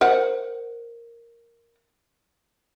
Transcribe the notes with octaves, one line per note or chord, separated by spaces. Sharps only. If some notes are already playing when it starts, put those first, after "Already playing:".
A#4 C5 F#5